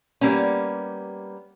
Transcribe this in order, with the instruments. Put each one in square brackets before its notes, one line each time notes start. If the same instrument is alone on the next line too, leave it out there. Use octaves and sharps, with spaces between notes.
[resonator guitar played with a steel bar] G3 A#3 B3 C#4